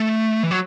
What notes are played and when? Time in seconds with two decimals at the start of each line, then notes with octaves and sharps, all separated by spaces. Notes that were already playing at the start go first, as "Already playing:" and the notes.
Already playing: A3
0.43 E3
0.51 F#3